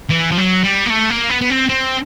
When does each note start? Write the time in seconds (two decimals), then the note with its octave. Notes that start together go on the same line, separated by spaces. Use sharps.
0.10 E3
0.31 F3
0.38 F#3
0.64 G3
0.86 A#3
0.90 A3
1.10 A#3
1.30 B3
1.41 B3
1.50 C4
1.69 C4